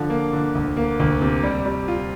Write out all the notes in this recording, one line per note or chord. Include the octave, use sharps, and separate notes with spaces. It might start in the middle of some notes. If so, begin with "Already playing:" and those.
Already playing: D3 F3
A#3
D3
D2
A#3
D2
C3
G3
G3
F4